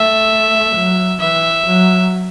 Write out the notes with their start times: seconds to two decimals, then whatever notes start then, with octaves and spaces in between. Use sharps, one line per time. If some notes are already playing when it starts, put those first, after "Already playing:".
Already playing: A3 E5
0.75 F#3
1.20 E3 E5
1.65 F#3